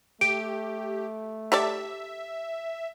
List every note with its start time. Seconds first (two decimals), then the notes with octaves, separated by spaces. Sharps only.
0.21 A3 G4 D7
1.52 G4 A4 D5 E5